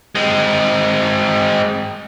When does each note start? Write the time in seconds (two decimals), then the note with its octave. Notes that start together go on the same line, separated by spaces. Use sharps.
0.15 G#3 C4